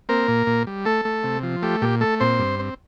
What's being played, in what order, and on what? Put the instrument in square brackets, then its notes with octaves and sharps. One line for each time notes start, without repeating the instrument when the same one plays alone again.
[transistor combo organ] A#3 C4 A#4
A#2
A#2
G3
A3 A4
A3
C3
F3
A3 G4
A#2 G4
A3 A4
A#2 C4 C5
G2
C4